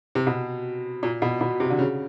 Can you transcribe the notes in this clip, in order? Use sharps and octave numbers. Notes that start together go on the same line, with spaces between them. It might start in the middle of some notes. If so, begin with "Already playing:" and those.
C3
B2
A#2
B2
B2
C3
D3
C#3